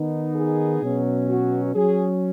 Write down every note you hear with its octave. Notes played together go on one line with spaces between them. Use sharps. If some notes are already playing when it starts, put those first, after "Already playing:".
Already playing: D#3 B3 D#4
G#4
B2 F#3 C#4
F#4
F#3 C#4 G#4